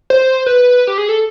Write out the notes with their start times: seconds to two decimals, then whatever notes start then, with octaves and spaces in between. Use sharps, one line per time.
0.10 C5
0.46 B4
0.87 G4
0.98 G#4
1.09 A4